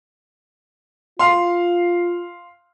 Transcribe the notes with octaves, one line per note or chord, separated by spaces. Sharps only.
F4 F5 C6